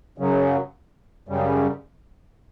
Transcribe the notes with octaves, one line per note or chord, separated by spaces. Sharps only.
F#2 C#3 F#3
F#2 C#3 G3